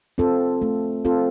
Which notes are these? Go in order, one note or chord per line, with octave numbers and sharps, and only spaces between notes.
C4 F4 A4
A3
C4 F4 A4